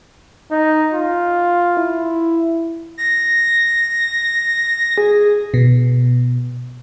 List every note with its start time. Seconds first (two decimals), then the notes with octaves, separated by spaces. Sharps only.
0.51 D#4
0.93 F4
1.78 E4
2.98 A#6
4.98 G#4
5.54 B2